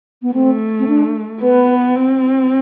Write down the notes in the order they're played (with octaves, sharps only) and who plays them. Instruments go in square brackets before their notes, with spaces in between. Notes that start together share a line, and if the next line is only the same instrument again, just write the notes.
[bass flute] B3
[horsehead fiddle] A3 [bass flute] C4
[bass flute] C4
D4
[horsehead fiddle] B3 [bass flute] B4
[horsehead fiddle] C4